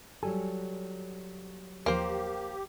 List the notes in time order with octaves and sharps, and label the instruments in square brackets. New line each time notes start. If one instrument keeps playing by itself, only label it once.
[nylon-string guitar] F#3 G3 A4 [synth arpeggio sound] G#5
[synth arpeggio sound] D#2 F3 [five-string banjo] A#3 C5 [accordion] G4